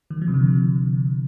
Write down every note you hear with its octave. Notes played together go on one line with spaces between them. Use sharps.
D#3
F3
C3
D3